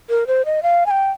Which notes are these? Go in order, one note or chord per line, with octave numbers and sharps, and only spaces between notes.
A#4
C5
D#5
F5
G#5
G5